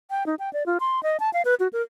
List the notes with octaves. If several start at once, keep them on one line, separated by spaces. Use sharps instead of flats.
G5
D#4
G5
D5
F4
C6
D#5
A5
F5
B4
F#4
A#4